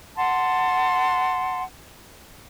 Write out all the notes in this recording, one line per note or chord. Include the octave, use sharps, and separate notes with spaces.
F#5 A5 C6